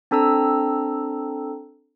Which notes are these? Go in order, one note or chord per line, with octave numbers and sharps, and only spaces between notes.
C4 D4 A4 A#5 E6